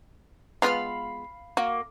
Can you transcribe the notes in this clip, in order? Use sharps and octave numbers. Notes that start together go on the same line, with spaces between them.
G#3 B3 F4 F5 B5 F6
A#3 F#4